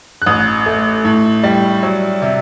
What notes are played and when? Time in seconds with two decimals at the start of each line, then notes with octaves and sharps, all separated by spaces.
0.22 F#6
0.26 A1 D#6
0.66 A3
1.04 A2
1.43 G3
1.83 F#3
2.22 C3